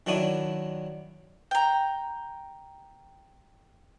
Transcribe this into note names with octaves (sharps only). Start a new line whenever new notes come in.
D#3 F#3 D4 E4 D#6
G5 A#5